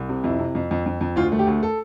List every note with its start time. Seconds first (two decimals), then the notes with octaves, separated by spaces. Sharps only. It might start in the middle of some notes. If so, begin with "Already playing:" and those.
Already playing: C2
0.09 C3
0.24 F2 E4
0.39 C3
0.55 F2
0.71 F2
0.86 F2
1.01 F2
1.16 D2 F4
1.32 A3
1.39 G4
1.47 D2
1.63 A4